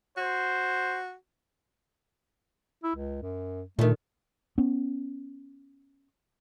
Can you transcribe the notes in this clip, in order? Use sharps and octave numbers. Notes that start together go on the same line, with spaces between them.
F#4 C5
E4
C#2
F#2
A#2 D3 D#3 A3
B3 C#4